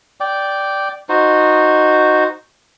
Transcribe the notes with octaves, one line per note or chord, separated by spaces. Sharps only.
D5 G5
D#4 F#4 C5